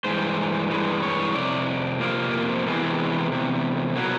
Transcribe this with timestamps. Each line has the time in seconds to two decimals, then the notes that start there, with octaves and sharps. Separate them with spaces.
0.04 G2 E3 G#3 C5
0.70 G2 E3 G#3
1.02 C#5
1.34 F2 C3 D5
2.00 F2 C3 F3 A#3
2.66 E2 C3 E3 G#3
3.32 E2 C3
3.95 B2 F#3 A#3